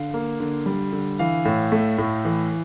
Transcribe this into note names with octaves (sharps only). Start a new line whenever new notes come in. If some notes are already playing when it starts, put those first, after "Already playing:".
Already playing: D3 F5
A#3
D3
G3
D3
E3 F5
A2
A3
A2
E3